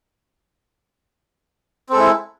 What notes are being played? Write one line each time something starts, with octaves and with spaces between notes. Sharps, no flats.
G#3 C4 E4 A4